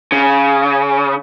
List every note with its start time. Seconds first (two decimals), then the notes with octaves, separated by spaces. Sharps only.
0.12 C#3